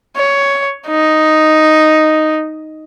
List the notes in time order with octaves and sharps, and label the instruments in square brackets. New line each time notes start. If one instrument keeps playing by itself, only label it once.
[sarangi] C#5
D#4